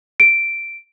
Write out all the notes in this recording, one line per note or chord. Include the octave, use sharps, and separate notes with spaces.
D7